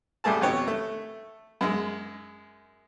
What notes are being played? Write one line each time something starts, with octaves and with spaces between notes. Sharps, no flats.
A1 G3 A3 G#4 A5
F2 B2 G4 C#5
A3
F#2 G#3